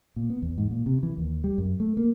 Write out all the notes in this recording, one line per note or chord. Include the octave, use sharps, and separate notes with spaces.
A#2
B3
E2
G#2
A#2
C3
E3
D#2
G3
F#2
A3
A#3